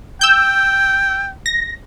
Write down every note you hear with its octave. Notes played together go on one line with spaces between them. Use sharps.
G5 E6 G6
A#6